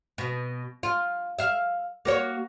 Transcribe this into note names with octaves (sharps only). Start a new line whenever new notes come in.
B2
F4
E5 F5
A#3 F#4 C#5